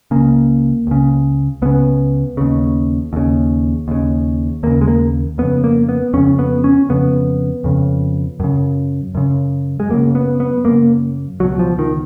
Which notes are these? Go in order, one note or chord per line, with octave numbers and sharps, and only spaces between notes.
C#2 C#3 A#3
C#2 C#3
C#2 C#3 B3
D#2 C#3
D#2 C#3
D#2 C#3
D#2 C#3 A#3
G#3
A#3
F2 C#3 B3
A#3
B3
F2 C#3 C#4
B3
C#4
F2 C#3 B3
F2 C#3
F#2 C#3
F#2 C#3
G#3
F#2 C#3 A#3
B3
B3
F#2 C#3 A#3
C#2 B2 F#3
F3
D#3